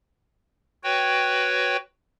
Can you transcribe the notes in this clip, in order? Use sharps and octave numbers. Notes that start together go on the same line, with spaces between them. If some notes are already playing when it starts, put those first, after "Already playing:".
F#4 B4 C#5 G5